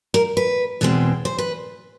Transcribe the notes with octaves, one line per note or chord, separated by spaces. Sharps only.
A#4
B4
E2 B2 G#3 C4
C5
B4